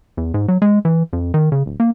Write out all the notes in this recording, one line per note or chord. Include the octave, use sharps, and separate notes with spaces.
E2
G#2
F#3
G#3
E3
F2
D#3
C#3
D1
A#3